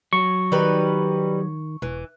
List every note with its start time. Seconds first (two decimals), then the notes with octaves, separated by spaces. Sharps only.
0.13 F#3 C#6
0.52 D#3 G3 D#4 B4
1.82 E1 E3